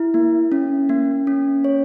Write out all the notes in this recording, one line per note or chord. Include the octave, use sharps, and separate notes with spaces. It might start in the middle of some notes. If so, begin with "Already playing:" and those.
Already playing: E4
A#3
C#4
A#3
C#4
C#5